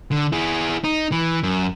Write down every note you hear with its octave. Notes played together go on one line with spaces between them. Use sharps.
D3
E4 G#4
D#4
E3
F#2